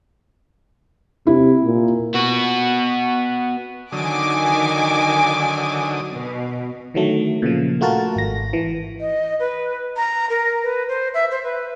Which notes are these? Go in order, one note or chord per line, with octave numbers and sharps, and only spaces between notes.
C3 E4
A#2
B3 F#4
D3 D#3 F#3 G#5 D6 D#6
B2
D3 D#3 F#3 A3
A#2 C#3 F3
A3 F4 F#4 A#4 A5
G#1 A#6
E3
D#5
B4
A#5
A#4
B4
C5
E5
C5
B4